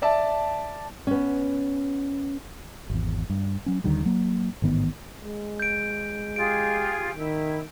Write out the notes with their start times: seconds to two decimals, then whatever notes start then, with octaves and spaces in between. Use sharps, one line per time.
0.02 D5 E5 A5
1.07 B3 C#4
2.90 G#1 E2
3.30 G2
3.66 F#3 C#4
3.84 D#2 D3 D#3 G3
4.05 F#3 A#3
4.62 A1 G#2 D#3 B3
5.21 G#3
5.60 G6 D7
6.36 F4 G4 G#4 D7
7.17 D#3 E4